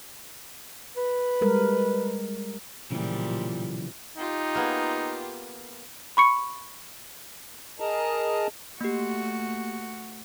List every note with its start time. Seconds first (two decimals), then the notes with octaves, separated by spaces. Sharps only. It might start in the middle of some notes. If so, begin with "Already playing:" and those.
0.97 B4
1.41 G3 G#3 A#4
2.91 B1 A#2 C#3 E3 F3 G3
4.17 D#4 F4 G4
4.55 A#3 B3 G#4
6.17 B5 C#6 C#7
7.80 G#4 A#4 D#5 A5 A#5
8.81 A3 A#3 F#4 G4